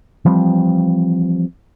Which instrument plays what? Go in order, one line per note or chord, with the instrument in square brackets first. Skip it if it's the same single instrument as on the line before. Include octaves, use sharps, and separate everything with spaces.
[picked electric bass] E3 F3 G3 C4